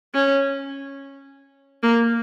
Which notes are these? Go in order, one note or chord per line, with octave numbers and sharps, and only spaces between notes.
C#4
A#3